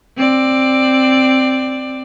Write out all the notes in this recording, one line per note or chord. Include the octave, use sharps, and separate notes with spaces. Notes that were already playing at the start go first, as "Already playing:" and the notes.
C4 D5